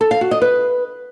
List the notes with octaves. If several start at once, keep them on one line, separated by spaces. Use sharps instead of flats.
A4
F5
F#4
D#5
B4